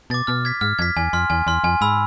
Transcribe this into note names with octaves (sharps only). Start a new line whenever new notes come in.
B2 D6 A6
B2 F6
G#6 B6
G#2 F6
F2 G#6 B6
E2 G#5
F2 C6 F6
E2 G#5
E2 C6 F6
F2 G#5
G#2 B5 E6